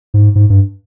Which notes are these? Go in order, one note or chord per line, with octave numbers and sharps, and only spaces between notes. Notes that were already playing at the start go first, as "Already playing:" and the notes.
G#2
G#2
G2